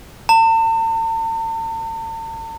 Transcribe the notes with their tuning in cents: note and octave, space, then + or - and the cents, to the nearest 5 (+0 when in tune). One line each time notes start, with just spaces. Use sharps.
A5 +45